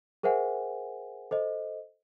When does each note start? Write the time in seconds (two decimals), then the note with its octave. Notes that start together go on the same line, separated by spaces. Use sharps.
0.23 G#4 A#4 C5 E5 F#5 G#5
1.31 A4 C5 D#5